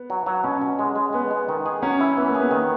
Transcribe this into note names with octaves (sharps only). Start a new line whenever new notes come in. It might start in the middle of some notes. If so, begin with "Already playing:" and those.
Already playing: B3
F#3
F#3
B2 C#4
B2
G#3
G#3
G#3 B3
G#3
D#3
G#4
F#3 C#4
E4
E3 B3
A#3
G#4
B3
D#3